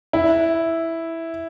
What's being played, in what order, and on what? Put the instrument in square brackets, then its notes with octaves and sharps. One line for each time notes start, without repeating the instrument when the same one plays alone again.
[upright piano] E4